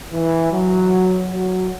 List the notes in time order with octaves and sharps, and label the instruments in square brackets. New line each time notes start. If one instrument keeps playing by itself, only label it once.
[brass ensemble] E3
F#3
F#3